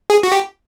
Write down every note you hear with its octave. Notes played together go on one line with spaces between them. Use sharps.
G#4
F#4
G4